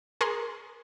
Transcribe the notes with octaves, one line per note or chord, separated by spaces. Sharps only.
G#4 A#4 C6